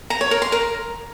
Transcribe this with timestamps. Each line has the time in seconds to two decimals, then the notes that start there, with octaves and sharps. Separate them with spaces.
0.10 A#5
0.21 C#5
0.31 A#4
0.42 C6
0.52 A#4